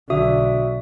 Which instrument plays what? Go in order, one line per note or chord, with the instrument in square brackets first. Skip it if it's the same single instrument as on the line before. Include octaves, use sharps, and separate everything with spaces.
[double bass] B1 D3 [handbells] F#4 E5 D#6